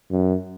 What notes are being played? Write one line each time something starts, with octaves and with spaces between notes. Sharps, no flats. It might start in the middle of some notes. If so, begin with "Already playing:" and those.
F#2